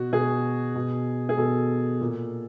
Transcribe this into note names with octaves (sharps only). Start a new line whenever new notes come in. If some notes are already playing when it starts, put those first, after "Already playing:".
Already playing: B2 F#4
B2 G#4
B2
G#4
B2 A4
A#2